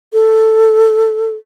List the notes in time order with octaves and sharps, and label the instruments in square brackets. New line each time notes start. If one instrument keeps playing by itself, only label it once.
[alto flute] A4